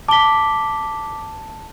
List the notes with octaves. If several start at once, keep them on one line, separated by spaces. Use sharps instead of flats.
A5 D6 B6 G7